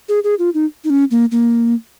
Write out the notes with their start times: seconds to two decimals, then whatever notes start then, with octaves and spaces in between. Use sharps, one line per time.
0.09 G#4
0.24 G#4
0.39 F4
0.54 D#4
0.84 D#4
0.90 C#4
1.11 A#3
1.31 A#3